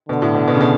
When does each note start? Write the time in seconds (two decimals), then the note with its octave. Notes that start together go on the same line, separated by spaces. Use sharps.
0.09 B2 D3
0.22 A2
0.35 B2
0.48 B2
0.55 C#3
0.61 B2